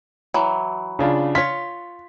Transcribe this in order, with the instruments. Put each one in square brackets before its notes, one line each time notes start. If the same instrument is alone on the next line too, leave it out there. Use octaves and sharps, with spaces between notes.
[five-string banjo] E3 F#3
[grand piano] C#3 D4 F4
[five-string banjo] F4 C#5 [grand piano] B6